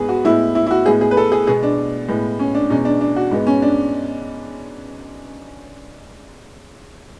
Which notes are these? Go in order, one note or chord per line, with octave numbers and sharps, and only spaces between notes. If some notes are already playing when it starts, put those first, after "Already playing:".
Already playing: G#2 G#3 B3 G#4 B4
F#4
A2 G#3 B3 E4
E4
E4
F#4
A2 G#3 B3 G#4
G#4
B4
A4
G#4
B2 G#3 B3 G#4
D4
A2 G#3 B3
C#4
D4
E2 B2 G#3 C#4
D4
D4
F#4
G#2 G#3 B3
C#4
D4